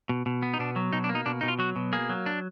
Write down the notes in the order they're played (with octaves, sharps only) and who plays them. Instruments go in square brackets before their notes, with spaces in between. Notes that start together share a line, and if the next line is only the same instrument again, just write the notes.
[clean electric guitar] B2
B2
B3
D#4
B2 D4
F#3
B2 D#4
D4
A#3
D#4
B2 D4
B2 D#4
F4
F#3 F#4
B2
A#3 G#4
F#3
D4